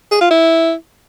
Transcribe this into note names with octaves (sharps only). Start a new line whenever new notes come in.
G#4
F4
E4